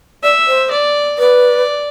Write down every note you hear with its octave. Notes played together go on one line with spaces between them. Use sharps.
D5 E5
C5
D5
B4 D5